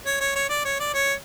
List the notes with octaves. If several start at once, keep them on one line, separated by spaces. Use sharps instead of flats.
C#5
C#5
C#5
D5
C#5
D5
C#5